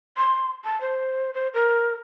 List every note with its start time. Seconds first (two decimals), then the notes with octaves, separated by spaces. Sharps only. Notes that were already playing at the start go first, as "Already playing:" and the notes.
0.17 C6
0.64 A5
0.81 C5
1.34 C5
1.54 A#4